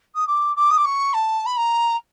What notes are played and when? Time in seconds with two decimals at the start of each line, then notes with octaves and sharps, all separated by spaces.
0.15 D#6
0.27 D6
0.56 D6
0.70 D#6
0.77 D6
0.84 C#6
1.13 A5
1.46 B5
1.57 A#5